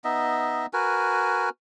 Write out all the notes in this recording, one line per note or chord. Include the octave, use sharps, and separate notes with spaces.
B3 D#4 D#5 E5
F#4 A#4 B4 G#5